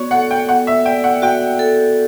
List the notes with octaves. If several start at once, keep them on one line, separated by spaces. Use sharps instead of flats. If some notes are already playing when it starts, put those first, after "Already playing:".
Already playing: B3 F#4 C#5 D5
A4 F#5
G5
B3 F#5
E5
D5 G5
F#5
F#4 G5
A4